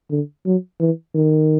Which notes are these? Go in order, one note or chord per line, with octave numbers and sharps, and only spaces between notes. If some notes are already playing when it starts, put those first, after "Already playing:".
D3
F#3
E3
D#3